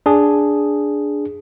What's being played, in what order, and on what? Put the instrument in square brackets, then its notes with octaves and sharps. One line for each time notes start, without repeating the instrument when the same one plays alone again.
[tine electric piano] D4 G#4